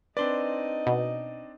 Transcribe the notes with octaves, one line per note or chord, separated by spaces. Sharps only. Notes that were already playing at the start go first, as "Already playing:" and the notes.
C4 D4 D#4 B4 D5 D#5 C6
B2